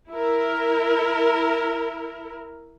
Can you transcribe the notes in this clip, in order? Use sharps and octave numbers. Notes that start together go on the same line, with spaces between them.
E4 A#4